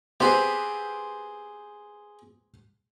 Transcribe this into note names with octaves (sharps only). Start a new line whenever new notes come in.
B3 C4 G4 G#4 C5